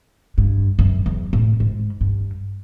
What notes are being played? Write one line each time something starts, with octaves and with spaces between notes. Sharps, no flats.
G2
F#2
E2
A2
G#2
G2